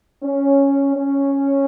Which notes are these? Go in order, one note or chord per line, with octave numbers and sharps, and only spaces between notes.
C#4
C#4